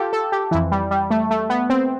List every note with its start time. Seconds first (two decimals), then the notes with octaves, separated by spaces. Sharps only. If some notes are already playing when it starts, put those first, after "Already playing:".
Already playing: F4 G4 A4
0.13 A4
0.32 G4
0.51 E3 E4
0.54 F2
0.72 G3
0.91 G3
1.11 A3
1.31 A3
1.50 B3
1.70 C4